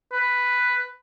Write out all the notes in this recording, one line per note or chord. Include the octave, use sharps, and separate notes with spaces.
B4